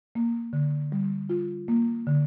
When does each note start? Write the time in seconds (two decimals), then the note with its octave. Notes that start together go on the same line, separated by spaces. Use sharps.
0.15 A#3
0.53 D3
0.92 G3
1.29 F4
1.68 A#3
2.07 D3